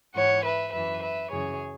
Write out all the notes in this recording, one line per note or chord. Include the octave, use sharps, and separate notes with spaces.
G#2 E3 C#5 F#5
B4 E5
F#2 E3 B4 E5
B4 E5
F#2 C#3 E3 G#4 C#5